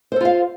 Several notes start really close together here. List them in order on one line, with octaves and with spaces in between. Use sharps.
C5 A4 F4 F5